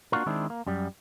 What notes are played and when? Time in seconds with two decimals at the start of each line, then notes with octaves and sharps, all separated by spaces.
0.12 A#3 D4 F4 F#4 A#4
0.26 D#3 G#3 C4 D4 E4
0.50 A#3
0.67 F#2 G3